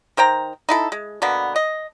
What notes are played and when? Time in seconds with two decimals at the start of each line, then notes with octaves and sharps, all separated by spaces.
0.17 D#3 C5 G5 A#5
0.69 D#4 E4 A4
0.92 G#3
1.22 B2 D3 A#3 B3
1.56 D#5